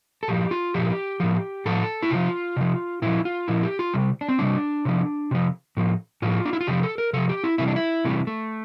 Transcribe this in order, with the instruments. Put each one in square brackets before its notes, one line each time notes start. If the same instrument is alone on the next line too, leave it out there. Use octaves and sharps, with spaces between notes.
[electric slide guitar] A4
A#2 F3 G4
F4
A#2 F3 G4
A2 F3
A2 F3 A4
E4
C3 F3 F4
C3 F3
A#2 F3 E4
F4
A#2 F3 E4
G4
F4
C3 G3
D4
C4
C3 G3 D4
C3 F3
C3 F3
A2 F3
A2 F3 F4
D4
E4
F4
C3 F3 G4
A4
A#4
C3 F3 A4
G4
E4
C3 E3 G3 E4
D4
E4
C3 E3 G3 A3
A3